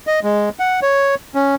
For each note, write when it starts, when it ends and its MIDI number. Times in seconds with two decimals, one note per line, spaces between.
0.07 0.20 75
0.23 0.49 56
0.59 0.80 78
0.82 1.15 73
1.35 1.55 61